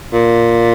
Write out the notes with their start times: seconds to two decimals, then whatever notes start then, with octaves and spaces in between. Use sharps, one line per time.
0.13 A#2